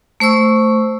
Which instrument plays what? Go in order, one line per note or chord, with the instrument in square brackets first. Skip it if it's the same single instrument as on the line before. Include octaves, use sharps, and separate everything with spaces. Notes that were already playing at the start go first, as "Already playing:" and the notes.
[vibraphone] A3 C5 C#6 E6